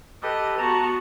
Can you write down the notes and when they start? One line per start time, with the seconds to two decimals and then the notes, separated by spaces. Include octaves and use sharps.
0.23 G4 A4 B4 D#5
0.59 B3 F#4 A5 A#5